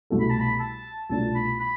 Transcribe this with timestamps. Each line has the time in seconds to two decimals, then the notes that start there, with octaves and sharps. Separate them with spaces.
0.10 C2 B2 A3 E4 A4
0.20 B5
0.30 A5
0.40 B5
0.60 A5
1.09 C2 B2 A3 D4 F4 A5
1.35 B5
1.60 B5